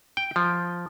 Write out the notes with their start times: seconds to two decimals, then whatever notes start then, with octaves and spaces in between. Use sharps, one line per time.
0.17 G5
0.36 F3